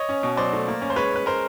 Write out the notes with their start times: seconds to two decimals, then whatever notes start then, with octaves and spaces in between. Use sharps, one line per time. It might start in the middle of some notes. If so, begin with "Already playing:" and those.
Already playing: C#5 D#5
0.09 C#4
0.23 B2
0.37 F#3 C5 D5
0.53 A3
0.68 A#3
0.81 C#4
0.90 C5
0.96 G#3 B4 C#5
1.12 C#4 B4
1.26 G#3 A#4 C5